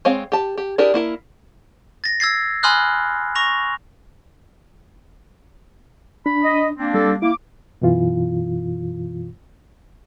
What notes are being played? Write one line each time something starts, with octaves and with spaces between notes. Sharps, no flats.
G#3 C4 C#5 F5
G4 A5
G4
D4 E4 G4 G#4 A#4
A#3 E4 A#4
A6 A#6
E6 G#6 A6 C7
G#5 B5 C6 D#6 F6 F#6
C#6 A#6 F7
D4 B5
D#5
A#3 C4 D4
G3 A4
A#3 E4 D6
F#2 B2 E3 F4